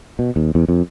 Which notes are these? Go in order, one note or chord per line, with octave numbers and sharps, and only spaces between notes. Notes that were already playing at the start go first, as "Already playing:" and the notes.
B2
D#2
E2
F2